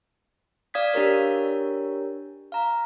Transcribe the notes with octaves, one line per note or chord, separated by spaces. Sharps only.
D5 F5 D#6 G#6 B6
D4 G4 A#4 C#5
F5 A#5